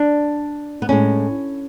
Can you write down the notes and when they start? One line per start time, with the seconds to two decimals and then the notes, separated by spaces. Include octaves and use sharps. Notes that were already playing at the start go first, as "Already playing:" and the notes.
Already playing: D4
0.82 B3
0.89 A2 G#3 C#4